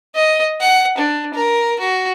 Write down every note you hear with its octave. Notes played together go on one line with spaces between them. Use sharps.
D#5
F#5
D4
A#4
F#4